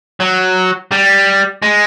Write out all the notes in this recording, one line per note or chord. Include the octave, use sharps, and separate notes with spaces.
F#3
G3
G#3